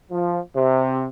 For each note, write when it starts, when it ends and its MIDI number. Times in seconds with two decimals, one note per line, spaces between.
0.10 0.38 53
0.55 1.06 48